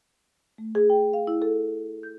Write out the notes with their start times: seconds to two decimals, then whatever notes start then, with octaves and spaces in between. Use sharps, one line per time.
0.58 A3
0.75 G#4
0.90 G5
1.14 F5
1.27 E4
1.42 A4
2.03 G6